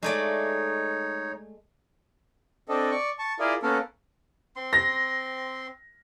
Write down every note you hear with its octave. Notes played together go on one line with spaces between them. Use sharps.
G#3 A3 D#4 C#5 D5
C4 D4 A4 D#5
D5 C#6
A5 C#6
E4 F4 G#4 A#4 D5
A#3 B3 C#4 A4 A#4
C4 C6
A#6